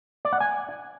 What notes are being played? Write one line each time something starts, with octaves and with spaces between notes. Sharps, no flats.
D5
F#5
G#5